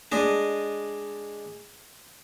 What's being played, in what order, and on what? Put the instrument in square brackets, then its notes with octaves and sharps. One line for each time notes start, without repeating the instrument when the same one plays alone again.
[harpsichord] G#3 D4 D#5